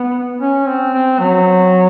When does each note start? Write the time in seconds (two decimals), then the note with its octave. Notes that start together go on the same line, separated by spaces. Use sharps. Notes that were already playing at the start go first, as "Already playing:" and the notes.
Already playing: B3
0.41 C#4
0.68 C4
0.94 C4
1.20 F#3